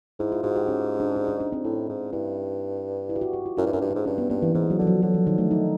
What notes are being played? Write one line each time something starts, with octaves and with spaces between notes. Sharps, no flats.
G#2 E4
F4
G#2 F#4
G4
C#4
D4
D4
D#4
D4
C4
A2 E4
G#2
G2 E4
E4
G4
F#4
G4
F4
F#2 E4
G2
F#2 D4
G2
G#2 D4
G2 C#4
B3
G2 A#3
E3
G#2 E3
F#3
D3 F3
F#3
D3 F#3
F3
D#3
A3
D#4